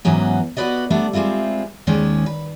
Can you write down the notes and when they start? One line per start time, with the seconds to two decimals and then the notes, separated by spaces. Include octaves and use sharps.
0.05 E2 G#2 E3 F#3 B3 C#4
0.57 B3 F#4 G4 B4 D5 D#5
0.90 G3 A3 B3 D4
1.13 G3 G#3 C4 E4 F4
1.87 D#2 D#3 G#3 C#4 D5
2.26 B4